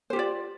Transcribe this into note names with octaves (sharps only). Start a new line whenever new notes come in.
F4 G4 C5 D5